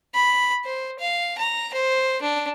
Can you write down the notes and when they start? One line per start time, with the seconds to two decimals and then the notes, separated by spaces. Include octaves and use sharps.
0.14 B5
0.65 C5
0.99 F5
1.38 A#5
1.74 C5
2.22 D4